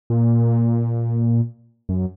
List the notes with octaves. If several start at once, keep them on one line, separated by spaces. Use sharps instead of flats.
A#2
F#2